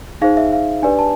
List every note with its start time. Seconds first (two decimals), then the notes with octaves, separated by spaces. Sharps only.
0.21 D#4 G#4 C5 F5
0.37 E5
0.52 F5
0.82 D4 G4 B4 D5 G#5
0.99 A5